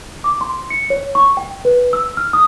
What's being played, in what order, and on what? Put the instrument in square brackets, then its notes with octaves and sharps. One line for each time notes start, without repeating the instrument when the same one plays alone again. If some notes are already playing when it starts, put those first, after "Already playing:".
[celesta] D6
C6
C#7
C#5
C#6
G5
B4
E6
F6
D#6